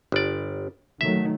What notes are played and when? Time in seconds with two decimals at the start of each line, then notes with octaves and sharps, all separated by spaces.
0.12 G1 D5
1.01 D#3 F#3 A3 E5